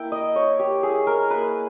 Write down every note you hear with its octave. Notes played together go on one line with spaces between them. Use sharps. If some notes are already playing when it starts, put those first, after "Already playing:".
Already playing: A#3 E4 G5
D#5
E4 C#5
G4
E4 G#4
A#4
A#3 B4